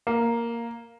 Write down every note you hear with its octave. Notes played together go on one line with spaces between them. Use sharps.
A#3